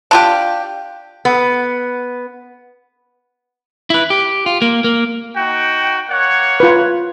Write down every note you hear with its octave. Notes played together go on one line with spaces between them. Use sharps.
D4 F4 G4
B3
E4 B4
G4
F4
A#3
A#3
D#4 F#4 G5
A#3 C#5 F#5
F4 B4